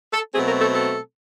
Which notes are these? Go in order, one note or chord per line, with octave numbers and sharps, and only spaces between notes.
A4
B2 F#3 A3 C4 G#4
A#4
A4
A4